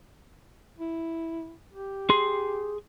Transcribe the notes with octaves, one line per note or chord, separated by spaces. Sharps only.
E4
G4
G#4 C6